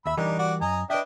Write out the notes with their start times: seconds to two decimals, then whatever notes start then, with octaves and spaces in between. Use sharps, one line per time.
0.06 D#2 E5 B5 E6
0.17 E3 G3 D4 D#4 A#4
0.39 F#4 D5
0.61 F#2 D#5 G#5 A#5
0.90 D4 B4 D#5 E5 G5